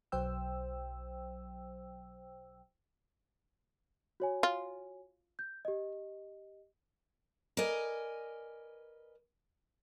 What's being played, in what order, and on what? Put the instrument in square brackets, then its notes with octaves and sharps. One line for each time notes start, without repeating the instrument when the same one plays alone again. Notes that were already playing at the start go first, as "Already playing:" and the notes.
[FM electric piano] B1 F#3 C5 G5 E6
[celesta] F#4 C#5 G#5
[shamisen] F4
[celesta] G6
G4 D#5
[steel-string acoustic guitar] A#4 B4 D5 D#5 G#5